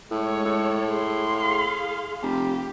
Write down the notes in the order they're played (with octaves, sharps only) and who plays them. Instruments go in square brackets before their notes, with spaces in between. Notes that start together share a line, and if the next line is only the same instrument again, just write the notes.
[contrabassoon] A2 [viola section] G#3 C#5
[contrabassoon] A2 [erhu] A4
[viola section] G#4 [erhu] C6
[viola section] G#4 F5
[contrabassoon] F1 [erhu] G4